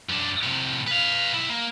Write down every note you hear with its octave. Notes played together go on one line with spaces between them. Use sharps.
F#2 D4
A2 C3
B4 F5
B1 E4
A#3